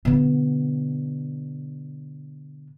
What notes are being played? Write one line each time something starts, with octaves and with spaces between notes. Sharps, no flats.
B2 D3